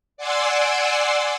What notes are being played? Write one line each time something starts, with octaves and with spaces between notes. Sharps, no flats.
D5 F#5 G#5 C6 D6 E6